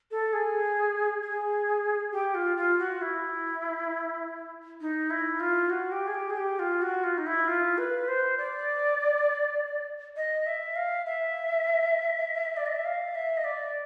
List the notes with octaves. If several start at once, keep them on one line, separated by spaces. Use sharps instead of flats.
A4
G#4
G#4
G4
F4
F4
F#4
E4
D#4
E4
F4
F#4
G4
G#4
G4
G#4
G4
F4
F#4
F4
D#4
E4
F4
B4
C5
D5
D#5
E5
F5
E5
D5
D#5
E5
F5
E5
D#5
D5